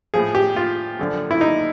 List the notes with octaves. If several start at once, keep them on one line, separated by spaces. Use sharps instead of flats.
A2 F3 G#4
G4
F4
F#2 D3 F3
E4
D#4